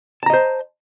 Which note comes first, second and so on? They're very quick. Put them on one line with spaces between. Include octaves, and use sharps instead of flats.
A5 A#5 D#5 C5